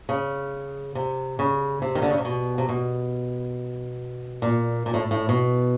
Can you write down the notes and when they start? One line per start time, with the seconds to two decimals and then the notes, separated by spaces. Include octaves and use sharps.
0.09 C#3
0.95 C3
1.39 C#3
1.82 C3
1.95 D#3
2.02 D3
2.10 C#3
2.17 C3
2.25 B2
2.58 C3
2.69 B2
4.42 A#2
4.86 A#2
4.94 A2
5.11 A2
5.29 B2